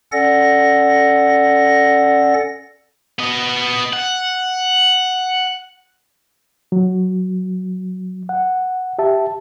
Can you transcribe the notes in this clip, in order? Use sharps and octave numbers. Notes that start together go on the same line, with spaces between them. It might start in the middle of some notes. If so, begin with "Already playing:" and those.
C#4 A4 D5 F#5 A#6
B3 D#5
F#5
F#3
F#5
G4 E5 A5